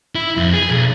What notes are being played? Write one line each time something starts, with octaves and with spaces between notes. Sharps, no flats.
E4
F2
G#4
B1